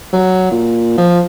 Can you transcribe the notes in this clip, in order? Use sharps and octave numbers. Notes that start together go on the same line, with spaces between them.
F#3
A#2
F3